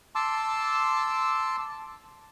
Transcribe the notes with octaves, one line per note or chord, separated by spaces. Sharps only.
A5 C6 D6 E6